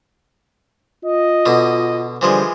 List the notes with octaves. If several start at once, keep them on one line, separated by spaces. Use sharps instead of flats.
F4 D#5
B2 D3
D3 E3 F3 G3 G#3 C5